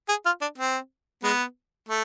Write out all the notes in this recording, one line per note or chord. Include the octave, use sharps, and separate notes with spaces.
G#4
F4
D4
C4
G#3 B3
A3